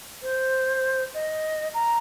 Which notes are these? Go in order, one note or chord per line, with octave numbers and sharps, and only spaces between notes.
C5
D#5
A#5